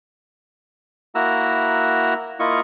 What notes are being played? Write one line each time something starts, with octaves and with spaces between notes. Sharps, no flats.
A#3 E4 F#4 A#5 E6
A#3 E4 F4 D#5 C#6